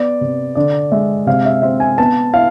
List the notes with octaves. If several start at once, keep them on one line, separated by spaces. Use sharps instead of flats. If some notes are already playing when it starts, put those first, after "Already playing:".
Already playing: B3 D5
C3
D3 D5
G#3 E5
C3 F5
E5
C4 E5
G#5
B3 A5
E4 F5